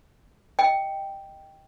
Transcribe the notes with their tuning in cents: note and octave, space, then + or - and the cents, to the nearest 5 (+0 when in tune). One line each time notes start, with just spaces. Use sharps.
D#5 +5 G5 +0